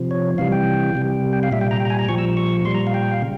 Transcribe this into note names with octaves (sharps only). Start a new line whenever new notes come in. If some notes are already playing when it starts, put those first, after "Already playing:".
Already playing: C3 F3
C#5
C3 E3 G3 F5
G5
C3 G3
G5
F5
A#2 G3 E5
G5
A#5
G5
A#5
G#5
A#5
A#2 F3 C#6
E6
C#6
A#2 G3 C6
A#5
F5
G5
F5
C#3